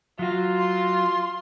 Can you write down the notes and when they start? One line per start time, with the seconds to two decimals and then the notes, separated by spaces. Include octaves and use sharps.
0.19 F#3 F4 F#4
0.58 C6